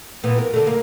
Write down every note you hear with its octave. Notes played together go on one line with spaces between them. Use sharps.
A#2 E3 B3
A#4
D3 A3
A#3